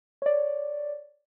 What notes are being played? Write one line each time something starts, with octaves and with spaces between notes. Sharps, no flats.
C#5 D5